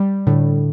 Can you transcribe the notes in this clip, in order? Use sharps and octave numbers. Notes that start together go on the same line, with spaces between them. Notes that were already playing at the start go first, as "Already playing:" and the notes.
Already playing: G3
A2 D3